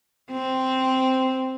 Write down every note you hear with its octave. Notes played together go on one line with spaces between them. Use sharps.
C4